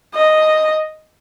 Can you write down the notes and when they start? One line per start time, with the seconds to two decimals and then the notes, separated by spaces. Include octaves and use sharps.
0.14 D#5